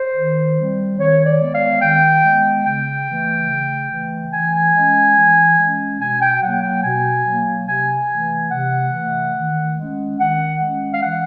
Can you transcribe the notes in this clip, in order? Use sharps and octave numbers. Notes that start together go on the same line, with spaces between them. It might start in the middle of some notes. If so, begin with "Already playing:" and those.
Already playing: C5
D#3
G3 C4
D#3 C#5
D5
G#3 B3
F5
D#3 G5
G#3 B3
C#3 G5
E3 A3
C#3
E3 A3
E3 G#5
G#3 C#4
E3
G#3 C#4
B2 G#5
G5
F#3 A#3 F#5
G5
B2 G#5
F#3 A#3
C3 G#5
E3 A3
C3 F#5
E3 A3
D#3
G#3 C#4
D#3 F#5
G#3 C#4
F5
E3 F#5